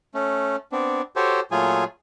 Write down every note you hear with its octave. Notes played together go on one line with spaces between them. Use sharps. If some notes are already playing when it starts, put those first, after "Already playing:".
A3 C#4
B3 C4 D4
F#4 G4 A4 C5 C#5
A#2 F#3 A3 F4 G#4 G#5